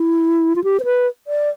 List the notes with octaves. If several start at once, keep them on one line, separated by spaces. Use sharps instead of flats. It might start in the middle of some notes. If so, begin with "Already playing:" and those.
Already playing: E4
F4
G4
C5
B4
D5